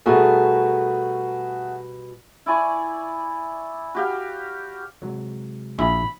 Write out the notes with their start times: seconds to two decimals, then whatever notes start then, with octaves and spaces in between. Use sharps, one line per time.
0.06 B2 G3 A3 F#4 G#4 A#4
2.46 E4 D5 G#5 C#6
3.95 F#4 G4 F5
5.02 C3 F#3 G#3
5.79 A#1 E4 B5